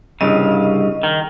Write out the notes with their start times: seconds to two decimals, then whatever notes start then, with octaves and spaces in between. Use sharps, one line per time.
0.21 C2 G2 C#3 D#5
1.03 D#3